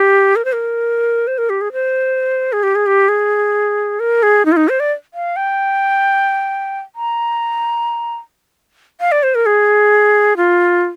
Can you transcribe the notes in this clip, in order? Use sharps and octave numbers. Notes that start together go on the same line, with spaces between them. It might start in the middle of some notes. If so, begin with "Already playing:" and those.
Already playing: G4
A#4
C5
A#4
C5
A#4
G4
G#4
C5
G#4
G4
G#4
G4
G#4
A#4
G#4
D#4
F4
D#4
C5
D5
F5
G5
A#5
F5
D5
C5
A#4
G#4
F4